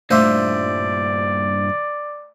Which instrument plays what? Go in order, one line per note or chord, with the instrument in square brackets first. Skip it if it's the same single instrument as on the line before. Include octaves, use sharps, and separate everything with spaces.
[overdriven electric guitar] G2 A#2 [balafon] A3 D6 [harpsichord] C5 E5 [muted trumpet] D5